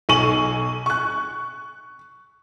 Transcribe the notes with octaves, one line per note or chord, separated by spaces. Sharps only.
B1 G#5 C#6 D#7 F#7
C#6 F#6